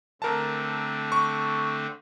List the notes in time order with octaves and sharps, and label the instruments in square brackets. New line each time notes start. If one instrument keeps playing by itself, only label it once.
[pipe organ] D3 A3 C4 [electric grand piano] A#4 A5
[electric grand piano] C#6